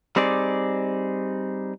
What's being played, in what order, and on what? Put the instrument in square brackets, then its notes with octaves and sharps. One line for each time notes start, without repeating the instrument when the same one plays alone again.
[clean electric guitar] G3 C4 D#4 G#4 D5